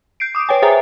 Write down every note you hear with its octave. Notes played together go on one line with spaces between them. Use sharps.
G6 C7 D7
D6 D#6
B4 C#5 G5 G#5
G#4 C5 E5 G5 G#5 A#5